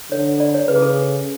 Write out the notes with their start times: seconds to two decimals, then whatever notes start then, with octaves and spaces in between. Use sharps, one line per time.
0.11 D3 C#5
0.40 D5
0.54 C#5
0.68 C#3 B4
0.76 G#4
0.82 A4